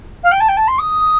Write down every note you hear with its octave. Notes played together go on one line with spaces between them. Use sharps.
F5
G5
A5
G5
A5
C6
D#6